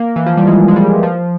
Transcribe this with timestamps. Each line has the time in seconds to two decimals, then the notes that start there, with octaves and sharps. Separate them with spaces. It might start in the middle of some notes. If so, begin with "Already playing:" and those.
Already playing: A#3
0.16 E3
0.26 F3
0.37 G3
0.47 G#3
0.68 G#3
0.76 G3
1.03 F3